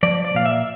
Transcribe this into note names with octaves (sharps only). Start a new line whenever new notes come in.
F3 D5
D5
A#2 F5
E5